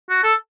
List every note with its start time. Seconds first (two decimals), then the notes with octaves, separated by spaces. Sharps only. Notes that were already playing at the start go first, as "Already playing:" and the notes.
0.10 F#4
0.24 A4